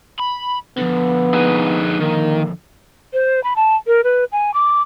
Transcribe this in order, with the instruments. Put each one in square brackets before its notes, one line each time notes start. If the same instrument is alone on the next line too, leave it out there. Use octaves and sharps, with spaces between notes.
[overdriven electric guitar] B5
[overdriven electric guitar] D3 F3 [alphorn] B3
[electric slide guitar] D#4 G#4 B4
[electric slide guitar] D#3 [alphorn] A#3
[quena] C5
B5
A5
A#4
B4
G#5
D6